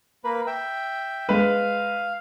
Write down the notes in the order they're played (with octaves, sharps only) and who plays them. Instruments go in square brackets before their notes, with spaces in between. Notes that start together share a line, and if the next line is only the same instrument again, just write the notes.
[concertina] A#3 B4
E5 G5
[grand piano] G#3 B4 [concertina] F5